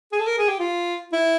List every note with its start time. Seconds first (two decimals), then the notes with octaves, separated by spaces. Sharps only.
0.12 G#4
0.19 A4
0.27 A#4
0.38 G#4
0.48 G4
0.59 F4
1.13 E4